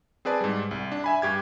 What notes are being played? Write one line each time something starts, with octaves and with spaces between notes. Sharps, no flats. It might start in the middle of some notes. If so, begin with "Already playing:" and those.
C4 G#4 B4 D5 A5
G#2 G3
C2
D4
E5 G#5 B5
G2 G4 G#6